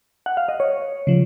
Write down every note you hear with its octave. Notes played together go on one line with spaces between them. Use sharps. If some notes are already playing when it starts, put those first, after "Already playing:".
F#5
F5
D#5
C#5
C#3 F3